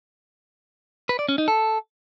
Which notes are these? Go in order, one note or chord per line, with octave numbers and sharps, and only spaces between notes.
B4
D5
C#4
D#4
A4